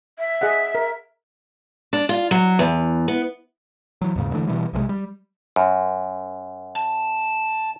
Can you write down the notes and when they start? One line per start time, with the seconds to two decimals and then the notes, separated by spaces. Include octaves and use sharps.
0.19 E5
0.41 G#4 D#5 F#5
0.75 A#4
1.93 D4
2.09 F4
2.31 F#3
2.59 E2
3.08 B3
4.01 E3 F#3
4.16 D#2 G#2 C#3
4.33 D3 E3 A3
4.47 B2 E3 G3
4.73 B1 C3 D#3 G#3
4.89 G3
5.56 F#2
6.76 A5